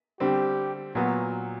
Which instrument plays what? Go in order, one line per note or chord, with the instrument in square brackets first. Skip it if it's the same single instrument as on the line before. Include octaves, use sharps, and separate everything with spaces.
[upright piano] D3 G3 C4 [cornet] G4
[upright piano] A#2 F#3 B3 [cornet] F#4